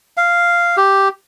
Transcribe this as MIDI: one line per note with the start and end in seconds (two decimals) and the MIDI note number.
0.17 0.76 77
0.77 1.08 67